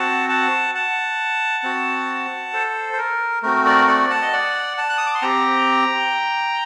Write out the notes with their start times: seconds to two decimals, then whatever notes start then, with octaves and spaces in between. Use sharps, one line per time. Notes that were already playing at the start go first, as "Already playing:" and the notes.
Already playing: C4 F#4 F#5 A5
0.29 F#5 A5
0.75 F#5 A5
1.63 C4 F#4
2.53 A4 C5
2.93 C5
2.98 A#4
3.43 A3 C4 F#4 A#4
3.65 A#4 D5
3.87 D5 F#5
4.10 F#5 A5
4.22 D#5
4.33 D5 F#5
4.77 F#5 A5
4.89 F#6
4.98 D#6
5.06 D6
5.15 C6
5.22 C4 G4 G5 A#5